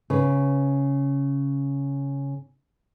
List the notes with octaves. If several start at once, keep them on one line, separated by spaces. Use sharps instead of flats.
C#3 B4